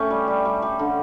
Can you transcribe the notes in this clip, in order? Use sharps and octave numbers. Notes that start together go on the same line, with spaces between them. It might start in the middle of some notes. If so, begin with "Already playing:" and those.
Already playing: A3 C#4 G4
G3
G3
G3
G3
D3